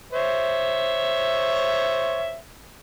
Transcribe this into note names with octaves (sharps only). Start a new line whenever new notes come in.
C5 C#5 E5